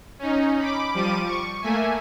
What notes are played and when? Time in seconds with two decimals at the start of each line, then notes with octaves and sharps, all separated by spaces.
0.19 C#4 D#4
0.60 B5 D6
0.94 F3 G3 D6 D#7
1.26 C#6
1.62 A3 A#3 E5 G#5